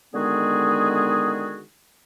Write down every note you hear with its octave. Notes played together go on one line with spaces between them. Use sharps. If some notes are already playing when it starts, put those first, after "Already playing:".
D3 D#3 G#3 B3 F#4 G#4